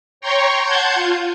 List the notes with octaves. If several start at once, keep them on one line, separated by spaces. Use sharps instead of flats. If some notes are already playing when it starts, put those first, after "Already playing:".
C#5 G5 A#5 C6 C#6
F#5 A5 C6 G6 G#6
F4